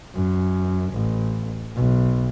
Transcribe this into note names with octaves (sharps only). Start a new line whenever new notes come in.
F#2
A1
B1